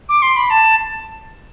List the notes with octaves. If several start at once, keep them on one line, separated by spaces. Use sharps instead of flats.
D6
C6
B5
A5